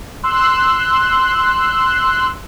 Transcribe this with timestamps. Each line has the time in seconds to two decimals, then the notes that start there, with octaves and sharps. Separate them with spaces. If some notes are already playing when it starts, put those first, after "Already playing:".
0.23 C6 E6 F#6